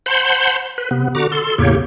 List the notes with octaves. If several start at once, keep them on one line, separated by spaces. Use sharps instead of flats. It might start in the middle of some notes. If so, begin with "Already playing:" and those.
C5 F#5 A5 B5 C6 G6
B4
C3 B3
D3 F#4 A#5 D6
A4 C6
E2 A2 C#3 A#3 G4 C#5